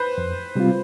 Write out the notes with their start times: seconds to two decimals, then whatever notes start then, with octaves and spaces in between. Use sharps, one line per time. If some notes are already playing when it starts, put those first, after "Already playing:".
Already playing: B4 C5
0.18 F2
0.55 C3 G3 C4 F4